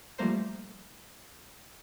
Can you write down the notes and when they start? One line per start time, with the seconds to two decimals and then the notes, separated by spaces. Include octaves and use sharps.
0.18 F3 G3 A3 A#3 A#4 C5